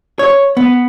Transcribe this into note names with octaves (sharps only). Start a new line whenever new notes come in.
C#5
B3